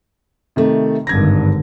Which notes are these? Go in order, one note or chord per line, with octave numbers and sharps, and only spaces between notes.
C3 D#3 A3
G#1 G2 D3 G#6 A#6